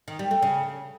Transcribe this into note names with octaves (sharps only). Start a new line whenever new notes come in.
D#3
G3
A3
C#3